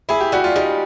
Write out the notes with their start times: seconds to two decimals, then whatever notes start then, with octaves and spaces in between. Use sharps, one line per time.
0.09 E4 G#4
0.21 G4
0.32 G3 F#4
0.44 F4
0.56 G3 D#4